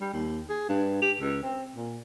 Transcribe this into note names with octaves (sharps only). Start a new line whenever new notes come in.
G3
D#2
G#4
G2
G4
C#2
C4
A#2